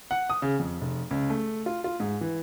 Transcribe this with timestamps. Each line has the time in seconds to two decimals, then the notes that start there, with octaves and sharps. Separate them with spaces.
0.11 F#5
0.30 D#6
0.42 C#3
0.59 F2
0.81 F1
1.11 C#2
1.30 A3
1.66 F4
1.84 F4
2.00 G#2
2.21 E3